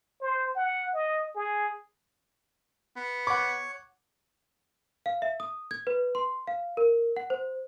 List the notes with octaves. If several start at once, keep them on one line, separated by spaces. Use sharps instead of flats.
C5
F#5
D#5
G#4
B3
C#5 F#5 C#6 D6
F5
E5
D#6
G#6
B4
C6
F5
A#4
F#5
C5